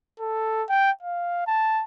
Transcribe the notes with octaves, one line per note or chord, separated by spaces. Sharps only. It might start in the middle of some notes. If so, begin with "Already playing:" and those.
A4
G5
F5
A5